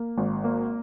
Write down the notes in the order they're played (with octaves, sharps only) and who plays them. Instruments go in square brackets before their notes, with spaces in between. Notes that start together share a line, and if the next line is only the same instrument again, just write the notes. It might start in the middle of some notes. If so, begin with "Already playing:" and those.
Already playing: [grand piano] A#3
G#1
A#3